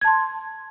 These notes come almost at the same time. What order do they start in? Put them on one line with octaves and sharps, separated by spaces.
G#6 A5 C6